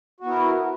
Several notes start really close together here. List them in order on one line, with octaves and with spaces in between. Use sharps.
F#4 B3 E4 A#4